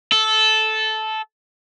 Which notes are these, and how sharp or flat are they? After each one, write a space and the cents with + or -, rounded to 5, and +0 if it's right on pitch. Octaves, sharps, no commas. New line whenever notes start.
A4 -10